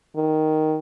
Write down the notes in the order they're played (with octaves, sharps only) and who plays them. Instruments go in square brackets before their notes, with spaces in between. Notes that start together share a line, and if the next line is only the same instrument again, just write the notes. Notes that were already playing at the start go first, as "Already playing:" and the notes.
[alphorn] D#3